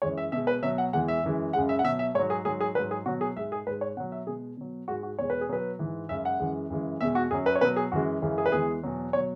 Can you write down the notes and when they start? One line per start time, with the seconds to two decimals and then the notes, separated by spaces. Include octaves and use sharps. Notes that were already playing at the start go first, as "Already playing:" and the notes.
0.02 F#2 E3 G#3 C#5
0.18 E5
0.32 B2 G#3 E5
0.47 B4
0.63 B2 F#3 E5
0.78 F#5
0.93 E2 E3 G#3 F#5
1.08 E5
1.24 F#2 E3 G#3
1.53 F#2 C#3 G#3 F#5
1.69 E5
1.79 F#5
1.84 B2 E5
1.89 F#3
1.99 E5
2.14 G#2 C#5
2.19 F#3
2.30 G#4
2.45 G#2 F#3 G#4
2.60 G#4
2.75 F#3 B4
2.80 G#2
2.91 G#4
3.06 B2 F#3 F#4
3.21 G#4
3.36 G#2 G#3 E5
3.52 G#4
3.67 G#2 B4
3.70 G#3
3.81 C#5
3.96 B2 F#5
4.00 F#3
4.12 E5
4.27 B2 G#3 G#4
4.57 B2 F#3
4.88 G#2 G#3 F#4
5.03 F#4
5.19 E2 B2 G#3 C#5
5.30 B4
5.41 G#4
5.49 B2 F#3 B4
5.79 G#2 E3 G#3
6.09 F#2 C#3 G#3 E5
6.25 F#5
6.40 F#2 E3 G#3
6.70 F#2 C#3 E3 G#3
7.01 E2 B2 G#3 E5
7.15 F#4
7.31 F#2 F#3 G#4
7.46 B4
7.55 C#5
7.61 B2 F#3 B4
7.76 G#4
7.92 F#2 E3 G#3 F#4
8.22 F#2 C#3 E3 G#3
8.38 G#4
8.46 B4
8.52 E2 E3 G#3 G#4
8.83 E2 B2 F#3
9.13 B2 F#3 C#5